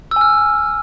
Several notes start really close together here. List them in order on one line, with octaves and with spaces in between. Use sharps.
E6 G#5 F6